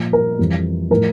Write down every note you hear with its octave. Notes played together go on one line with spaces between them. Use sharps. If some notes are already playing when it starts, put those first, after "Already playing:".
Already playing: A#2 F3
A#4
F2 E3 G3
A2 F3 A#4